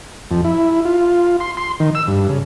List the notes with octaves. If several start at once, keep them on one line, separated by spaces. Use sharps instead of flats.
F2
E4
F4
C6
C6
D#3
E6
G2
C#3